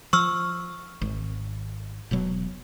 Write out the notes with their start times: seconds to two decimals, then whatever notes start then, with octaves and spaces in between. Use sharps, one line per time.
0.13 F3 C#6 E6 F6
1.02 G#1
2.11 E1 B2 F#3